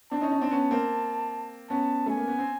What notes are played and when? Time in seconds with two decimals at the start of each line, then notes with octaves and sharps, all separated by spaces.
0.11 C4 D4 A5
0.21 C#4 D#4
0.32 C#4 D#4
0.41 C4 D4
0.51 B3 C#4
0.71 A#3 C4
1.70 B3 C#4 A5
2.06 A3 G#5
2.17 A#3
2.28 B3
2.38 C4